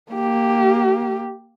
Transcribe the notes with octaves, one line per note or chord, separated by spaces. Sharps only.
A#3 G4